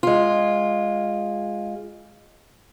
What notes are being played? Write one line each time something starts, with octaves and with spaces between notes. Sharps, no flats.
G#3 F4